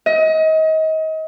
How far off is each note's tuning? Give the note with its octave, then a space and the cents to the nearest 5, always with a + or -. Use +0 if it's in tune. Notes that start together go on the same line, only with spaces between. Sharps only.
D#5 +30